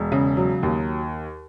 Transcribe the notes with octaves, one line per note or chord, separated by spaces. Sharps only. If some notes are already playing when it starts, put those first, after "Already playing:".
Already playing: E1
C#3
F#3
D#2